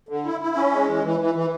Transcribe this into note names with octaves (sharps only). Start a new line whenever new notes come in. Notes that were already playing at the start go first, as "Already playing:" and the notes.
D3
E4
E4
C#4
G#3
E3
E3
E3
E3